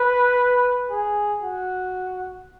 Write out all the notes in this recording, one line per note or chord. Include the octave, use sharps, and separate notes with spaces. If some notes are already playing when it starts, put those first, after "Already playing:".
Already playing: B4
G#4
F#4